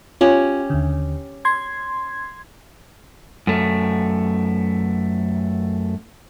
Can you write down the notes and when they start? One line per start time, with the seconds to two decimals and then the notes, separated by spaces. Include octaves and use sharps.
0.21 C#4 F4 G4
0.70 D#2 D3
1.45 C6 G#6
3.47 F#2 A3